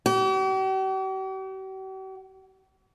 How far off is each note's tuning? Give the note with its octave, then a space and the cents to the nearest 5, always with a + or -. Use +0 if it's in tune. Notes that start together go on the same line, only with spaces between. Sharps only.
G4 -45